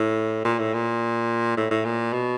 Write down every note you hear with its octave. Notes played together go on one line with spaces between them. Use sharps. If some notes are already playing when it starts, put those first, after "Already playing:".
Already playing: A2
A#2
A2
A#2
A2
A2
A#2
B2